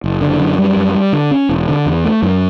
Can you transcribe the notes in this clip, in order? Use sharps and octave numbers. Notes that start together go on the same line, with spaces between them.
F#1
D3
F#2
G3
F#2
G3
D3
C#4
E1
D3
E2
A3
F#2